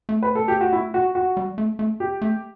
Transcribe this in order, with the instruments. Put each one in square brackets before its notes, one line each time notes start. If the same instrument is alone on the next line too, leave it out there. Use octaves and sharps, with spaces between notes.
[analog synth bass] A3
[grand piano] B4
A4
G4
F#4
E4
F#4
F#4
[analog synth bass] G3
A3
A3
[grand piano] G4
[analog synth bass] A3